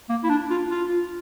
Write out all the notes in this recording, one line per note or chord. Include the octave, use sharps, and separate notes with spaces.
A#3
E4
D4
F4
F4